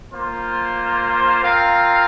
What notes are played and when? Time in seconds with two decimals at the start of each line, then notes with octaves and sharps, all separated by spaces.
0.14 A#3 F4 C5
1.42 C4 F4 A#4 F5